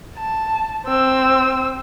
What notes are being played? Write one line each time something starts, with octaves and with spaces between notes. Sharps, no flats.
A5
C4 E6